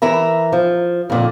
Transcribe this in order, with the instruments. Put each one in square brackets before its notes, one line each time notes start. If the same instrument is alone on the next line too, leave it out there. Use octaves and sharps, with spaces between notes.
[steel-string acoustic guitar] E3 A#4 E5 A#5
F3
F2 A#2 D3